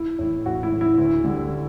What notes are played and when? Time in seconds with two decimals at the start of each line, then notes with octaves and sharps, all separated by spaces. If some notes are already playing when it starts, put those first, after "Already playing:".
Already playing: E4
0.19 A2 E3
0.46 A1 F#4
0.63 E4
0.72 A2 E3
0.81 E4
0.98 D2
1.24 D3 G3